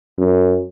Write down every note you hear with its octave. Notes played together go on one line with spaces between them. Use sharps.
F#2